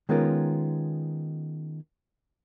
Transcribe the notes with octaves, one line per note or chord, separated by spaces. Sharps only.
D#3 G#3 B3 C#4 F4 A#4